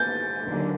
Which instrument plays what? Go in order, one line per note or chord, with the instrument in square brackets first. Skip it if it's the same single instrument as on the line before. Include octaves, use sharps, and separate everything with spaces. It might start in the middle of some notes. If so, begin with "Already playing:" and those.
Already playing: [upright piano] G6 A6
[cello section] D#2 D3 F#3 A#3